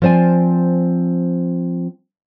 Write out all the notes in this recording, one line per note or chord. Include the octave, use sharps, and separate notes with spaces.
F3 C4 C5 D5 G#5